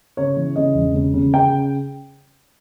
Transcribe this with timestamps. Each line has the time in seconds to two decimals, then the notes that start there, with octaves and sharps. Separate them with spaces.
0.17 C#3 C#5
0.37 E3
0.56 C#3 D#5
0.75 E1
0.95 C#3
1.14 C#3
1.34 C#3 G5